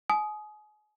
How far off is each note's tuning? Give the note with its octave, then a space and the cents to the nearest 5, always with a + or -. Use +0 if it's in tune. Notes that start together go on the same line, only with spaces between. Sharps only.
G#5 +35 D#6 +0